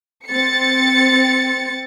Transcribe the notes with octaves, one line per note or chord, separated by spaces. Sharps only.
C4 A6 C#7